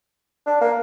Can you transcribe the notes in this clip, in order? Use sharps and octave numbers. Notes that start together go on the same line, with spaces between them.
D4
A#3